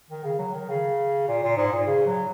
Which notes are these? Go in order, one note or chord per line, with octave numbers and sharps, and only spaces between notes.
D#3
C#3
F#3
D#3
C#3
A#2
A#2
G#2
A#2
C#3
F#3